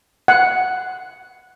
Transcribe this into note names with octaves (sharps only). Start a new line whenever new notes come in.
F#5